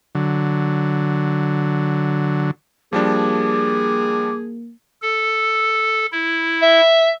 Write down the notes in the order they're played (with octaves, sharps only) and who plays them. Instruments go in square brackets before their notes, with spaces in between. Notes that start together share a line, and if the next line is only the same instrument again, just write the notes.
[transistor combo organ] D3 F#3
[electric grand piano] F3 G3 D4 [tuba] A#3 [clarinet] G#4 [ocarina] D6
[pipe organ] A4
E4
[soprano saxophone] E5